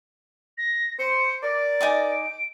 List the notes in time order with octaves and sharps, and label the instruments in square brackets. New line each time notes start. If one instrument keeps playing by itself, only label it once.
[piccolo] A#6
[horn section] C5 [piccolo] C#7
[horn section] A#4 D5 [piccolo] A6
[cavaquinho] D#4 G#5 D6
[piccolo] D7